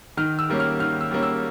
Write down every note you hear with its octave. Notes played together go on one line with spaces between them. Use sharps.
D#3 F6
E6
G3 A#3 C#4
F6
D#3 F6
E6
G3 A#3 C#4
E6